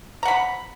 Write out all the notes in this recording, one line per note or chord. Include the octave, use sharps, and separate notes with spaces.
F#5 A#5 B5